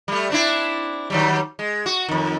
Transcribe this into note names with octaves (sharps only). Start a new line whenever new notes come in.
G3 A3
C4 D4 E4
D#3 F#3 G3
G#3
F#4
F2 D#3